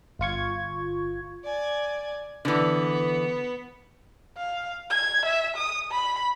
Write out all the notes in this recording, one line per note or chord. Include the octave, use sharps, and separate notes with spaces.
G1 F4 C#6 G#6
D5 G#5
D3 E3 B3
F5
G#6
E5
D#6
B5